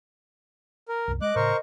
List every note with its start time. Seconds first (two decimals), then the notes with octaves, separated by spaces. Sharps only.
0.88 A#4
1.08 C2 F#2
1.21 G#3 D#5 D6 F#6
1.36 A2 C#3 A#4 C5 C#6